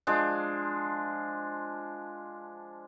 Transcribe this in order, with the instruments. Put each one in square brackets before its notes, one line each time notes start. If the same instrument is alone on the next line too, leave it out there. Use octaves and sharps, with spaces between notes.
[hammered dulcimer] F3 G#3 D4